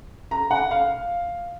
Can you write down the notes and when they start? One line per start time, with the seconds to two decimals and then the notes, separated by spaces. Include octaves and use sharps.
0.31 A#5
0.51 F#5
0.71 F5